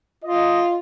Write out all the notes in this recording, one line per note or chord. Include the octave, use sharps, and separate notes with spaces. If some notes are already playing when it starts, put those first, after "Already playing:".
F4 D#5